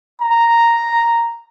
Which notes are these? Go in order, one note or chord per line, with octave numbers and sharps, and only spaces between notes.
A#5